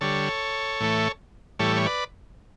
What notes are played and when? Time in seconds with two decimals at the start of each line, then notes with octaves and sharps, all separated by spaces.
0.01 D3 G3 A4 C#5
0.80 A2 E3 A3
1.59 A2 E3 G3 A4 C#5
1.76 C#5
1.86 B4 D5